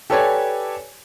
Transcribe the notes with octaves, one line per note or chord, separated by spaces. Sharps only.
G4 A4 B4 C#5 D5 G#5